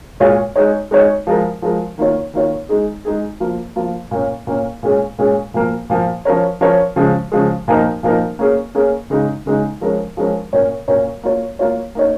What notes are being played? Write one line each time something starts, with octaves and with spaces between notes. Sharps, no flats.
A#2 G#3 F4 C#5
G#3 D#4 C#5
G#3 D#4 C#5
F3 G#3 F4 A#4
F3 G#3 F4 A#4
D#3 A#3 F4 C#5
D#3 A#3 F4 C#5
G#3 D#4 G#4
G#3 D#4 G#4
F3 A#3 F4
F3 A#3 F4
A#2 A#3 C#4
A#2 A#3 C#4
A#2 G#3 C#4 G#4
A#2 G#3 C#4 G#4
A#2 F3 A#3
A#2 F3 A#3
F3 C#4 A#4 C#5
F3 C#4 A#4 C#5
C#3 F3 G#3
C#3 F3 G#3
A#2 F3 A#3 D#4 A#4
A#2 F3 A#3 D#4 A#4
A#3 C#4 G#4
A#3 C#4 G#4
C#3 G#3 D#4
C#3 G#3 D#4
F3 G#3 C#4 A#4
F3 G#3 C#4 A#4
A#2 A#3 C#4 A#4 C#5
A#2 A#3 C#4 A#4 C#5
A#3 F4 C#5
A#3 F4 C#5
A#3 D#4 C#5